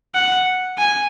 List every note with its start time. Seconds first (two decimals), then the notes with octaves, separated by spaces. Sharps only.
0.15 F#5
0.78 G#5